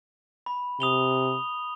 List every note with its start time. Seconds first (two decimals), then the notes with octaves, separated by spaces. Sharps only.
0.46 B5
0.80 C3 D#6 F7 G7